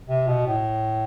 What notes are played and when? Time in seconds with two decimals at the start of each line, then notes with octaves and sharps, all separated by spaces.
0.08 C3
0.27 B2
0.47 A2